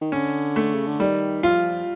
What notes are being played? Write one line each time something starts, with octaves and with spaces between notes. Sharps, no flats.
D#3
D3 C#4
A3
C#3
D3
D#3 G3
F3 F4